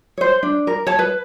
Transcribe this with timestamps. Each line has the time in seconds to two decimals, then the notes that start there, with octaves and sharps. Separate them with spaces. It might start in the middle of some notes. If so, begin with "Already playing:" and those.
0.18 C5 C#5
0.43 D4
0.67 A#4
0.87 C#5 A5
0.99 B4